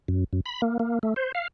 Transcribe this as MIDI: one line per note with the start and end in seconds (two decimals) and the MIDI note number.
0.08 0.24 42
0.33 0.41 42
0.46 0.61 83
0.62 0.78 58
0.79 0.99 58
1.03 1.14 57
1.16 1.32 72
1.35 1.48 77